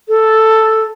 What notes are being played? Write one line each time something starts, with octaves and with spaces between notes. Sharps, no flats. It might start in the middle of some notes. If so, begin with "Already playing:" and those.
A4